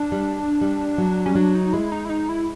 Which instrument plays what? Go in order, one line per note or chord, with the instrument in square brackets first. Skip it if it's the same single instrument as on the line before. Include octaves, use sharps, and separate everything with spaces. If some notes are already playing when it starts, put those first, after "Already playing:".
Already playing: [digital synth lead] D4
[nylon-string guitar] G3
G3
F#3
[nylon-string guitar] G3 [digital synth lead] C#4
[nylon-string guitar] F#3 [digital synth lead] D4
[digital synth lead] D#4
[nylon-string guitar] G#3 [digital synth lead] E4
[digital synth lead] D#4
E4
D#4
E4